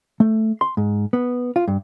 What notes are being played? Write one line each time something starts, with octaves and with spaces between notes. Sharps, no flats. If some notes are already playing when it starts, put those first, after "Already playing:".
A3
C6
G#2
B3
F4
G2